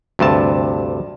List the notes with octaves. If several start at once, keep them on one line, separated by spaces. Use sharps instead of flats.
D2 G2 C3 A5